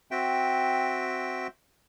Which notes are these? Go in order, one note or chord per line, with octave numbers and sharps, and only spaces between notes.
C4 F#4 E5 G5